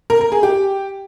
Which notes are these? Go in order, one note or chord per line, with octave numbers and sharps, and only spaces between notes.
A#4
A#4
G#4
G4